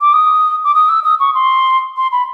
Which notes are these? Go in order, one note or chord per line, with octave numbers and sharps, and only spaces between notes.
D6
D#6
D6
D#6
E6
D#6
C#6
C6
C6
B5